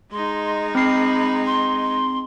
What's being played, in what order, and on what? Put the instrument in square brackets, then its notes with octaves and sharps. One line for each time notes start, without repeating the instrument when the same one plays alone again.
[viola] G#3 D#4 [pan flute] C6
[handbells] C4 C7 [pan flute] B5
[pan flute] C6